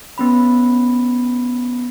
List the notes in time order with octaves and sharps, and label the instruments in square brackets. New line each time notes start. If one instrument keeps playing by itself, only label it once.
[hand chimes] B3 C#4 B5